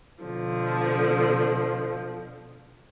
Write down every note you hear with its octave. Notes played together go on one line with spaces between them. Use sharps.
B2 D3 F3